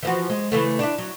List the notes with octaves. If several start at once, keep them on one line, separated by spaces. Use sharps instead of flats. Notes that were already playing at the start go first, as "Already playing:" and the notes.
E3 F3 F#4
G#3
C#3 E3 A3
D4 E4
F#3